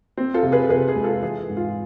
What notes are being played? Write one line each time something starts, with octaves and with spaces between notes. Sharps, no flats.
C4
F4 A4
C3
G#4 B4
A4
C3 G#4 B4
G#4
G#3
F4 A4
E3 G#4
G#2
F4